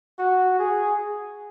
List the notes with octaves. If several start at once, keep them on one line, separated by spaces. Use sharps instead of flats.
F#4
G#4